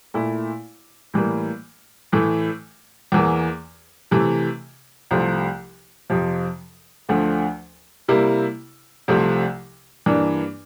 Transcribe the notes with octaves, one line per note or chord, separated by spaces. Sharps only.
A#2 A3 E4
A2 E3 G3 A#3
A2 E3 A3
E2 E3 A#3
C3 E3 A3
C2 C3 F3 A3
F2 C3 F3
D2 D3 F3 A3
C3 G3 A#3 E4
C2 C3 F3 A3
G2 E3 A#3 D4